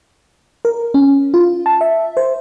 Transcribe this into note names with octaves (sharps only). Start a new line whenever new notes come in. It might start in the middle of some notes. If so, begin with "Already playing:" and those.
A#4
C#4
F4
A5
E5
C5